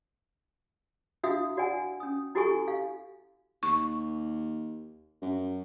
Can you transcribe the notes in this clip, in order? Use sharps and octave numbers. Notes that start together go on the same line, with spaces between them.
D4 E4 F#4 E5 F5 D#6
F#4 D5 F#5 G#5
C#4 D#6
E4 F#4 G4 A4 G#5 C#6
F5
D#2 C#6
F#2